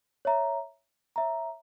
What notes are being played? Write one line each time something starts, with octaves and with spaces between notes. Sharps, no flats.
C#5 E5 A#5
C#5 E5 A#5